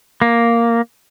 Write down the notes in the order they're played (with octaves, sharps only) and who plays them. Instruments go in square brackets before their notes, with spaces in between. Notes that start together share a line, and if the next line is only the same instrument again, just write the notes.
[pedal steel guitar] A#3